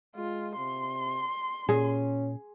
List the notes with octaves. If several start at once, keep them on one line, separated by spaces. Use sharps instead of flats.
G#3 F4
C3 C6
A#2 C#4 G#4